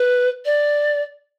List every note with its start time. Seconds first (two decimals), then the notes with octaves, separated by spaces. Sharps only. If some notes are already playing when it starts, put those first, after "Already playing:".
Already playing: B4
0.45 D5